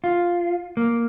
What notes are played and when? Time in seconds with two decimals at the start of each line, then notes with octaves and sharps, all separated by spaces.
0.04 F4
0.77 A#3